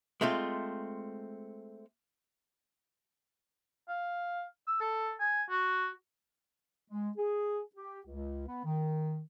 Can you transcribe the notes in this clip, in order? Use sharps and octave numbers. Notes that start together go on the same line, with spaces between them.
G#3 A3 C4 F4
F5
E6
A4
G#5
F#4
G#3
G#4
G4
C#2
B3
D#3